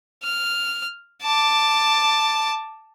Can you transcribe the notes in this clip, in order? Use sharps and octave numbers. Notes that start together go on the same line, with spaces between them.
F6
A5 D6